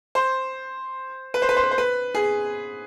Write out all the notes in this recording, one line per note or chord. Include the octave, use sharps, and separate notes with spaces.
C5
B4
C5
B4
C5
B4
C5
B4
G#4